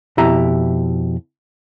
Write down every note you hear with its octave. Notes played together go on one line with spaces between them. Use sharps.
F2 B2 E4 G4 E5 A#5